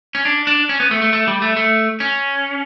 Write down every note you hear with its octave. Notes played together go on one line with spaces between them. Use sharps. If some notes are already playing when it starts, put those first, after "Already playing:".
C#4
D4
D4
C#4
B3
A3
A3
A3
G3
A3
A3
C#4